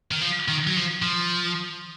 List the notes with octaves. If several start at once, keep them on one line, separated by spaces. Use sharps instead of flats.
D#3
F3
D#3
F#3
F3
F3